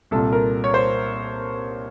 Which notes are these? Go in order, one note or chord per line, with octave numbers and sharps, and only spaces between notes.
C2 A#2 A4
A#4
C#5
C5